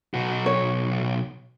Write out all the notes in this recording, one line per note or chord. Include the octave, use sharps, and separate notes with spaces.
B1 F#4
C#5